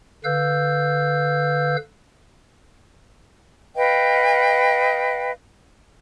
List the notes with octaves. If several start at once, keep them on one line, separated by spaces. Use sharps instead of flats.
D3 B4 F5 E6 G6
B4 D#5 F5 G5